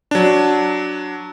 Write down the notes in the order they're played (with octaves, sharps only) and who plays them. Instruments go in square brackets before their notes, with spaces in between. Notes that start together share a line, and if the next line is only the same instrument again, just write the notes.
[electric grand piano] F#3 D4